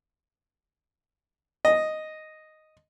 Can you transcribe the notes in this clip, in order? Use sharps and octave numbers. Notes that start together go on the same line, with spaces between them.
D#5